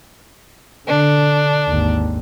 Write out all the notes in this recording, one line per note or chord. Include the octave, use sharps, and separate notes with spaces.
D3 D4
G#1 D#2